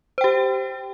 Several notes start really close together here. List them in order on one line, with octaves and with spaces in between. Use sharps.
C5 G5 G4